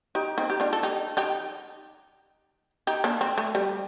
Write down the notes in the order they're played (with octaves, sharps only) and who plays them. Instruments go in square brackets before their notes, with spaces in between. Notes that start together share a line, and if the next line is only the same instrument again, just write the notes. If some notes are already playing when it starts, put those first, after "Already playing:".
[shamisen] D#4 G4
C4 D#4
G4
D4 F4
A4
D#4 G4
D#4 G4
D#4 G4
A#3 D4
C4
A3
G3